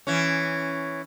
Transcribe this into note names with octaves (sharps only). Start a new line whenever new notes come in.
E3 C#4